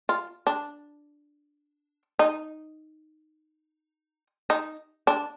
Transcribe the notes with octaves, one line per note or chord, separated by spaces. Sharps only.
F4
D4
D#4
D#4
D4